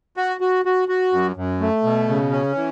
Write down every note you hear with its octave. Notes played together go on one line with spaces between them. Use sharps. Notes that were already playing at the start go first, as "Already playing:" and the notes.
F#4
F#4
F#4
F#4
F#2
F#2
A3
B2
C#3
C#4
E3